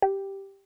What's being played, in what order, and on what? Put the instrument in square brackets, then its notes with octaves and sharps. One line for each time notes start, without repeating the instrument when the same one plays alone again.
[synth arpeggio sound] G4